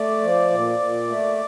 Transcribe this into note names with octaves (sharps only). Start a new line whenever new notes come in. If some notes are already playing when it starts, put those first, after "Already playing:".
Already playing: A3 D5
F3
A#2
A#2
A3